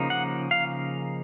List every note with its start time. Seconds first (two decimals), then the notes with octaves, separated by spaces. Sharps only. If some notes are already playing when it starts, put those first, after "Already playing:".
Already playing: C#3 F3 A#3 D#4
0.10 F#5
0.51 F5